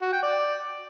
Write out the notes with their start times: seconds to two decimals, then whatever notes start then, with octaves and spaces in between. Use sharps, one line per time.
0.02 F#4
0.12 G5
0.23 D5